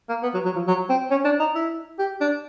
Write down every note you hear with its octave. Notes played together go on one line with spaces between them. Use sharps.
A#3
B3
F#3
F#3
F3
F#3
C4
C#4
D4
D#4
E4
G4
D4